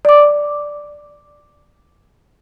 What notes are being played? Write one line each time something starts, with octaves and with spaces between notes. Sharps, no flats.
D5 D6